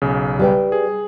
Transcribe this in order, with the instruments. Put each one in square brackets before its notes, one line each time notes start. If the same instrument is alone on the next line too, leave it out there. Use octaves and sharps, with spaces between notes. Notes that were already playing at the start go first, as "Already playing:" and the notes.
[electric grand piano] B1 C#3
[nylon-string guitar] G3 B4 G5
[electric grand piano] G#4